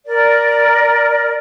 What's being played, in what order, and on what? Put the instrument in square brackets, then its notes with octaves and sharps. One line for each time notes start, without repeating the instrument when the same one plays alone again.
[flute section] A#4 D5